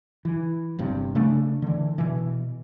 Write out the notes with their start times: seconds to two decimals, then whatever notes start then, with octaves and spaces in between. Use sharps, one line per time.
0.25 E3
0.79 G1 G2 C3
1.15 C#3 A3 D4
1.62 D3 E3
1.98 B2 E3